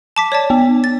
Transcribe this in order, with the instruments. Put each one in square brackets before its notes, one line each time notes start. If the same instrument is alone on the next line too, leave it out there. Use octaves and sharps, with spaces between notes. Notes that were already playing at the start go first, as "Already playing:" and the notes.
[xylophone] A5 D6 B6
C#5 D5 A5
[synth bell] B3
[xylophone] A6